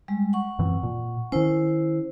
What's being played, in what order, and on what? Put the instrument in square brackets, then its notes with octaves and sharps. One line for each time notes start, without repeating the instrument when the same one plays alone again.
[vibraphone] G3 G#3
F#5 C#6
[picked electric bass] F#2 E3 C4
A#2
[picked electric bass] D#3 C#4 [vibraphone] E4 C5